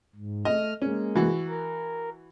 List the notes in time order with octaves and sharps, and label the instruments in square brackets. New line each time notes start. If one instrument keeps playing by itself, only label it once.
[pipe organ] G#2
[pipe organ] A3 F6 [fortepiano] D#5
[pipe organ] G#3 A#3 [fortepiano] C#4
[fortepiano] E3 F#4
[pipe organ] A#4